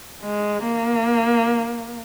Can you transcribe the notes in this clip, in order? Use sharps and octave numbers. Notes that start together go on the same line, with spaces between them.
G#3
A#3